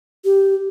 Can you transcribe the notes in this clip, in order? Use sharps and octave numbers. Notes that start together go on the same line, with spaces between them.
G4